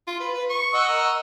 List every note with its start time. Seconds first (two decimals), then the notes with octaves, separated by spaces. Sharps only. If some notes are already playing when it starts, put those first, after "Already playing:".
0.07 F4
0.20 B4
0.34 B4
0.50 C#6
0.74 D#5 F#5 E6
0.88 A#4